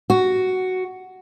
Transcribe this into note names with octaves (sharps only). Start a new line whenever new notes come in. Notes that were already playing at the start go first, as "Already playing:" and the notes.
F#4